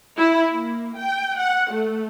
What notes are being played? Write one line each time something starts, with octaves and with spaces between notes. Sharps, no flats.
E4
A#3
G5
F#5
A3